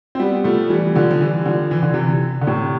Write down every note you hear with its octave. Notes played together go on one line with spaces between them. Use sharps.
C4
G3 B3
F3 A3
E3 G3
D3 F3
F3
E3 G3
D3 F3
E3
D3
C3 E3
D3
A2 C3